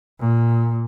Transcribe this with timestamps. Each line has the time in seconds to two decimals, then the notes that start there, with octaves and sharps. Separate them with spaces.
0.20 A#2